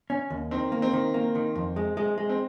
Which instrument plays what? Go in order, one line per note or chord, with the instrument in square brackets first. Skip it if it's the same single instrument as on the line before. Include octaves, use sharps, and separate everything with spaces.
[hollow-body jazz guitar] C#4
D#2
[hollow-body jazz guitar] D#3 [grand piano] C4
[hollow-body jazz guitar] A#3
[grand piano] C4
[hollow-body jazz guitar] D#3
A#3
D#3
F2
G#3
G#3
G#3
[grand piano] C4